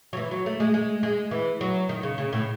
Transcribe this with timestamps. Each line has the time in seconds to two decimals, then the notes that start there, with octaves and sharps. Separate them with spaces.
0.13 F#3
0.17 E3
0.31 F#3
0.46 A3
0.60 G#3
0.74 G#3
1.03 G#3
1.31 E3
1.61 F#3
1.89 D#3
2.03 C#3
2.18 C#3
2.33 A2